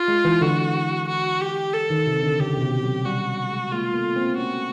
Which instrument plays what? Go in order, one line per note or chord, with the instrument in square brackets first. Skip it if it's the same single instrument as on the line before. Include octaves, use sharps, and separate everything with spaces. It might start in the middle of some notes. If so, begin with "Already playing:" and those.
Already playing: [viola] F4
[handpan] G#3
E3
[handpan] D3 [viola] F#4
[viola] F#4
G4
A4
[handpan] D#3
C3
D3
[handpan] C#3 [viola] G4
[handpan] B2
C3
F#3
[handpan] G3 [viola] F#4
[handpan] G3
G#3
[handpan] G#3 A#3 [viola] F4
[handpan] A3 B3
A#3 C4
[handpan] B3 C#4 [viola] F#4